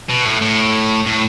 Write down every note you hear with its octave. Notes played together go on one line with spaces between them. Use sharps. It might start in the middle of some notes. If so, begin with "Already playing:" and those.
B2
A2
A2
A2